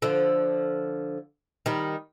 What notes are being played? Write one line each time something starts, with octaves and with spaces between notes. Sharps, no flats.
D3 F3
D#3 G3